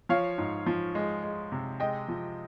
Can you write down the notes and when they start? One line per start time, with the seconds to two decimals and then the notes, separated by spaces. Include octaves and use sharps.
0.09 F3 C#5 F5
0.38 G#2
0.66 F3
0.95 G#3
1.23 G#3
1.52 C3
1.80 G#3 D#5 G5
2.08 F3